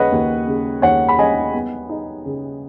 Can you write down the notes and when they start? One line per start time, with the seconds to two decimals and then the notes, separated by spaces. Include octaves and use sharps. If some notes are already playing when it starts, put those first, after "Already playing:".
Already playing: D#2 C#3 B4 C#5 D#5 F#5
0.12 D#2
0.47 C#3
0.82 D#2 C#5 F#5
1.09 B5
1.19 C#4 D#5 G#5
1.54 B3
1.89 D#4
2.25 C#3